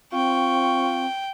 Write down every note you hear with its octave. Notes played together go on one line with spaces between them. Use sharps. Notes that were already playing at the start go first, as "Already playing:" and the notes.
C4 F4 G5 C#6